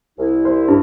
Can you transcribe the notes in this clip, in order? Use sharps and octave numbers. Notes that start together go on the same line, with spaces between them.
C2 E4
C5
G2